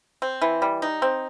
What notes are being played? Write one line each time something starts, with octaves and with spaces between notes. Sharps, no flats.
C4
E3
G3
D#4
C4